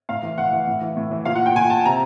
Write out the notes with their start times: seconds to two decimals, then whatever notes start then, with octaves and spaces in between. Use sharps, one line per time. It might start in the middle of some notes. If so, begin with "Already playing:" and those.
0.09 A2 F5
0.22 E3
0.37 A2 F#5
0.52 E3
0.67 A2
0.81 E3
0.96 A2
1.11 E3
1.25 A#2 F5
1.35 F#5
1.46 G5
1.55 A#2 G#5
1.70 A5
1.85 C3 A#5